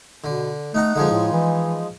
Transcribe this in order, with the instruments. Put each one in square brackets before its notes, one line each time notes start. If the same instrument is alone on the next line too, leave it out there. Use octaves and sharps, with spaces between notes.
[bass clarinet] B2 [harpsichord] D3
[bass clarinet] A3 [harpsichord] D#4 F#5 A#5
[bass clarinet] D3 [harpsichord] F3 G#3 D#4
[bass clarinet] A2
E3